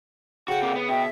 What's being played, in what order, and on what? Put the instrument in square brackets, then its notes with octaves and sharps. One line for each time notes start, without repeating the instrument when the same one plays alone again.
[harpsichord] C#3 A4 [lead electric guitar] F#4 [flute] F#5 [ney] G5
[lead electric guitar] C3 A#3
B3
[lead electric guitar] B2 [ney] E5 [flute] G5